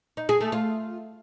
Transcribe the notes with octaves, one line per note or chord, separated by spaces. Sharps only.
D#4
G#4
A3
F4